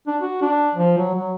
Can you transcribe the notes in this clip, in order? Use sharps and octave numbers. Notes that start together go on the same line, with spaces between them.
D4
F#4
D4
F3
F#3
F#3